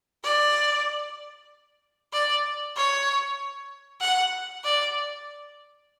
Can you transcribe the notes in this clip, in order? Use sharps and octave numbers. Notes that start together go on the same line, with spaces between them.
D5
D5
C#5
F#5
D5